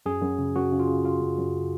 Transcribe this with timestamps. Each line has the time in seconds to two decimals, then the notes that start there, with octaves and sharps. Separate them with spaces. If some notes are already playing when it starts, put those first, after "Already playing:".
0.06 F#2 G#4
0.22 F#2
0.39 C#3
0.55 F#2 F#4
0.72 C#3
0.80 F4
0.88 C#3
1.04 F#2 F4
1.21 F#2
1.38 F#2